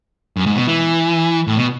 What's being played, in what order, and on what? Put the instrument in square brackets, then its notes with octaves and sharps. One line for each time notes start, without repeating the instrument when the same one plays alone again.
[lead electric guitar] F#2
G#2
B2
E3
A2
B2